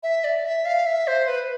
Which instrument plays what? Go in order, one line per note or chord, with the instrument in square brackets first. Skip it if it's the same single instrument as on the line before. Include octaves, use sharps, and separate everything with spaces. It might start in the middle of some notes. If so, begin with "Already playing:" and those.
[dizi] E5
D5
E5
F5
E5
C5
B4